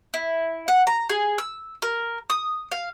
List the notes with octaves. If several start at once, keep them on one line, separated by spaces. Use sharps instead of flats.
E4
F#5
A#5
G#4
E6
A#4
D#6
F5